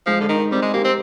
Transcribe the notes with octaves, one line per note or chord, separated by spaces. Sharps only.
F3 G#3
D3
D#3 D#4
G3 C4
G#3
A#3 G4
C4